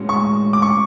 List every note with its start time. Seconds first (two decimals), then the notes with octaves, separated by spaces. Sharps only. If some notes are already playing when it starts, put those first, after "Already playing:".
Already playing: A2 G#3 C#4 F#4
0.09 C#6
0.53 D6
0.62 C#6